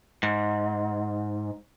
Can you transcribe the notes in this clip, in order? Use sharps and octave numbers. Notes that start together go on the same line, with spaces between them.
G#2